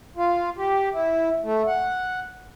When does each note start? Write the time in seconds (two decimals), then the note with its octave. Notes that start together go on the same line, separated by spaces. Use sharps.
0.17 F4
0.57 G4
0.93 E4
1.43 A3
1.67 F#5